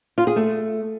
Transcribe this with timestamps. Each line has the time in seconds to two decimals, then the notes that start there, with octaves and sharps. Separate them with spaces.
0.18 F4
0.27 G#4
0.36 A3